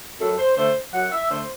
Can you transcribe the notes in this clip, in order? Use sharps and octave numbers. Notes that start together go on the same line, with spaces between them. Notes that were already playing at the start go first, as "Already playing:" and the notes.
F#2 A4
C5
D3 A3 C5
F#2 F#5
E5
D3 A3 C5